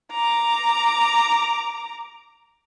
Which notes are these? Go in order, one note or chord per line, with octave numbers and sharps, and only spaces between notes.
A#5 D6